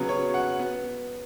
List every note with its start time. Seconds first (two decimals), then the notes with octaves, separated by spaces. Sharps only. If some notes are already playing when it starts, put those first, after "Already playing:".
Already playing: C#3 F#3 B3
0.09 C#5
0.34 F#5
0.59 B3